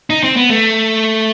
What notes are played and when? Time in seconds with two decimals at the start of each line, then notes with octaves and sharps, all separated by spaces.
0.10 D#4
0.23 C4
0.37 B3
0.50 A3